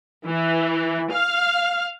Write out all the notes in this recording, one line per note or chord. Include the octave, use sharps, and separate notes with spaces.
E3
F5